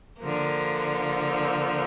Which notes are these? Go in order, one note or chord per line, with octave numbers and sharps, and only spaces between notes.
D3 F3 A#3